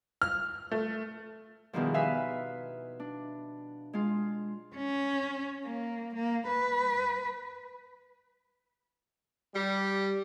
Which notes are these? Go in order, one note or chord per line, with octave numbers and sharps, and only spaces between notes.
F6
A3
E2 G2 B2 D#3 F3
D#4 B4 E5 F5 G#5
D4
G#3 F4
C#4
A#3
A#3
B4
G3